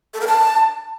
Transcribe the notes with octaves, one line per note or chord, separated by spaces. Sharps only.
A4
A#4
A5